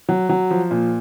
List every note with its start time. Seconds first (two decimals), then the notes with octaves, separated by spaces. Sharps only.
0.09 F#3
0.29 F#3
0.51 F3
0.71 A#2